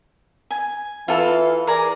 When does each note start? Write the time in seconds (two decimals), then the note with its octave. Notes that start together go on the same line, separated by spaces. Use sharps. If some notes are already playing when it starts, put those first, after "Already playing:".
0.51 G#5
1.08 E3 F4 A4 F5
1.67 G#4 A#4 D5